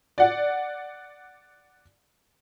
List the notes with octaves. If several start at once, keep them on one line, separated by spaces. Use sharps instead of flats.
D5 F#5